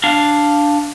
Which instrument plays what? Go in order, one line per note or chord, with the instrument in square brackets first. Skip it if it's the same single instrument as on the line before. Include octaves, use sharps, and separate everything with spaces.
[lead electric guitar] D4 F5